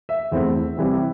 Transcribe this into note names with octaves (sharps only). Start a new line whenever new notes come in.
E5
E2 E3 A3 C4
C3 E3 G3 C4